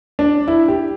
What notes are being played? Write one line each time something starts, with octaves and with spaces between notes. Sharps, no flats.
D4
E4
G4